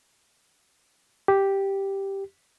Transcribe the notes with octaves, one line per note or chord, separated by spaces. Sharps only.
G4